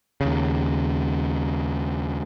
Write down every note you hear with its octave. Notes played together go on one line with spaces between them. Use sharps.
D#2 C#3